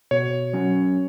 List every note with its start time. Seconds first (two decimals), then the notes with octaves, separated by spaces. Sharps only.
0.11 B2 C#5
0.53 F#3 C#4